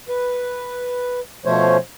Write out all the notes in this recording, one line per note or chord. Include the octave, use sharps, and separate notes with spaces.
B4
B2 F3 A3 C#4 C5 C#5